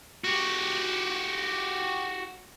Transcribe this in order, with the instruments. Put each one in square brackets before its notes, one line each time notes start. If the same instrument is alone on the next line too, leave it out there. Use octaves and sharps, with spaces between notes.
[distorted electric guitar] F#4 G4